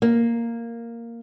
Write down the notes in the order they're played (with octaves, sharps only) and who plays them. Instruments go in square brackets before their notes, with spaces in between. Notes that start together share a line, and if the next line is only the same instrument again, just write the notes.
[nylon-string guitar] A#3